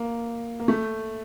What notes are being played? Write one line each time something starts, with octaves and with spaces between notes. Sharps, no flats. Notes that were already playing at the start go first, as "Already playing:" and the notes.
Already playing: A#3
A#3
A3